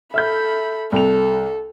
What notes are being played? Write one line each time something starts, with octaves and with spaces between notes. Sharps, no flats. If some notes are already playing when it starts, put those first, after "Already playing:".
A4 E5 B5 F6 G6
C2 A4 F7